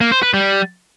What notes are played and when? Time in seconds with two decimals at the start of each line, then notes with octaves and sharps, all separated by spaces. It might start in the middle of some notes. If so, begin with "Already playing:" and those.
0.01 A#3
0.12 C5
0.23 B4
0.34 G3